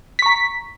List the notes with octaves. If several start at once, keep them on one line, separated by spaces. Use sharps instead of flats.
A#5 C#6 B6